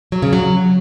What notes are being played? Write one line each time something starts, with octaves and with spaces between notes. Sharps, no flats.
F#3
C#3
F#3